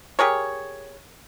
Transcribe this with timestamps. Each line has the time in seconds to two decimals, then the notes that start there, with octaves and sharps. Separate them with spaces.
0.19 G4 G#4 A#4 C#5